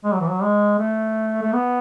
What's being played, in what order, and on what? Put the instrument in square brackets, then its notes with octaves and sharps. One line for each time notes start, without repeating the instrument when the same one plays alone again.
[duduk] G#3
F#3
E3
F#3
G#3
A3
A3
B3